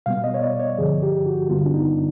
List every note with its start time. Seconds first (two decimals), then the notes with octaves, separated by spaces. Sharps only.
0.06 B2 G3 B3 F5
0.24 D#5
0.34 C#5
0.42 D5
0.59 C#5
0.78 G2 D3 F3 G#4
1.03 G4
1.26 F#4
1.50 G2 D3 G3 B3 F4
1.66 D4
1.74 D#4